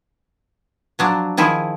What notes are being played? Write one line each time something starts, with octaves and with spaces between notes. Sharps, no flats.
F3 F#3 D4
D#3 F3 E4 G#4